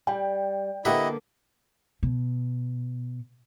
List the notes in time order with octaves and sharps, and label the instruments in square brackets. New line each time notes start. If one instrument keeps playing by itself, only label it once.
[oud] G3 [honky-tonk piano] G5
[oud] D3 A#3 B3 [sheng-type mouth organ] E4 D#5 [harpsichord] G4 E5 F#5
[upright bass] B2